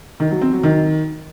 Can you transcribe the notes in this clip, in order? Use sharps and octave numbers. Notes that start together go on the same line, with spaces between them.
D#3
F#3
C4
F#3
D#3